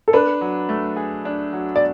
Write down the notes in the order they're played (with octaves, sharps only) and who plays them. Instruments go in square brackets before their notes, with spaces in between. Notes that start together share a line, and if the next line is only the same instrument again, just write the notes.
[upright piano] A4
[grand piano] D4 [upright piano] B4
[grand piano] F#3
A3
G#4
D4
F#3
[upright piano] D5